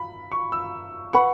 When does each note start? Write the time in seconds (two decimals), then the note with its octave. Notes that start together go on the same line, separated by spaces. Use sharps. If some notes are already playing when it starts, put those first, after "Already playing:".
Already playing: B5
0.32 C#6
0.52 E6
1.13 B4 F#5 B5 C#6